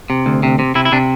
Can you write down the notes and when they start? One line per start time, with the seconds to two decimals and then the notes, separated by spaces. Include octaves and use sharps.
0.10 C3
0.26 D2
0.43 C3
0.59 C3
0.75 C3 E4
0.85 E4
0.92 C3 D4